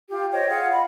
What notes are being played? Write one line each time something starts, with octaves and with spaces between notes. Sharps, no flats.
F4 G4
C5 C#5 D#5 G5
F4 G#4 F#5
F4 D#5 B5